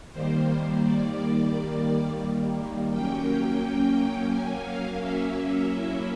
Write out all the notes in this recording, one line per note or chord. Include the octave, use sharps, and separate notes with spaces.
D#3 G3 A#3 C5
D5
F#3 A#3 C#4 G5
G#5
F5
E5
F#3 A#3 C#4 E4